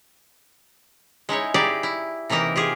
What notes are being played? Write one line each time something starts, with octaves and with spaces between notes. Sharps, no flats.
G#3 D#4 E4 C#5
D#4 E4 G4 G#4 D5
E4
C3 E3 A#3 D#4 A#4
F4 G4 G#4